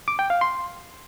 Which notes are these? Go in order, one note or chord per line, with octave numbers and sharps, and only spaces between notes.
D6
G5
F5
C6